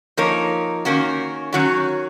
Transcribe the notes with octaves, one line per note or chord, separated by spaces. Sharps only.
F3 A#3 D#4 A#4 C#5
D#3 A#3 C#4 F#4
D#3 F#3 C#4 F#4 C#5